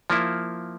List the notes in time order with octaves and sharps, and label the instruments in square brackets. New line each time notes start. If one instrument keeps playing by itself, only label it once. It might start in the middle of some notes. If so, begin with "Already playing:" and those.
[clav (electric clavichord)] F3 A#3 E4